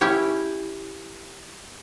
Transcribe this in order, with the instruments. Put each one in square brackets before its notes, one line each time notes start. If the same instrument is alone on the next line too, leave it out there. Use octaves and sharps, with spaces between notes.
[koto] C#4 E4 G4 C#5